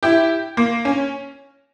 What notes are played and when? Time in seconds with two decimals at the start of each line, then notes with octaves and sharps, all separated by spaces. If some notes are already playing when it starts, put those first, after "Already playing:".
0.03 E4 G4
0.57 A#3
0.85 C#4